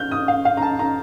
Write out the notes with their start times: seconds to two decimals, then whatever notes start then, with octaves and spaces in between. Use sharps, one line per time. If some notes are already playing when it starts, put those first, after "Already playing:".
Already playing: F6 G6
0.11 D#6
0.28 F5
0.45 F5
0.57 A#5
0.62 A5
0.79 A#5